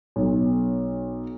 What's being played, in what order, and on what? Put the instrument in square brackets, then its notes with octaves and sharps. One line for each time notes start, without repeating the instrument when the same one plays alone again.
[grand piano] B1